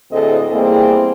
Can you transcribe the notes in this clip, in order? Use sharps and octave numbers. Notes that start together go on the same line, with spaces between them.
D2 A2 C4 G#4 A4 D#5
E2 G3 A#3 C4 E4 G#4